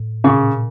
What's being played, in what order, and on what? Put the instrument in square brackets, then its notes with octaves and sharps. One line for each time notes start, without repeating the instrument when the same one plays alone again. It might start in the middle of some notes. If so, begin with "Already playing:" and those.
Already playing: [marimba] A2
[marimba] A#2 [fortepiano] C#3